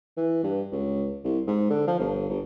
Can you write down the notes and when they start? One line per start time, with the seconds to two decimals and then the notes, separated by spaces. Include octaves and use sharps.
0.17 E3
0.44 G2
0.72 C#2
1.24 C2
1.47 G#2
1.70 D3
1.87 F3
1.99 G1
2.29 G1